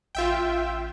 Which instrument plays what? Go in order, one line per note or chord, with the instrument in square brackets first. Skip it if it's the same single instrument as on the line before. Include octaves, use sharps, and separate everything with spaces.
[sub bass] A1 [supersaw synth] F4 E5 G5